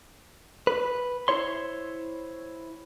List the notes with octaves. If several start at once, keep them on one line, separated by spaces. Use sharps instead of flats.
B4
E4 C5 C#5 C6